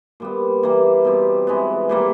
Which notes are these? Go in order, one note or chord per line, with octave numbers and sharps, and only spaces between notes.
A#2 G3 B3
E3 G3 A#3
B2 G3 C4
E3 G#3 B3
A#2 G3 A#3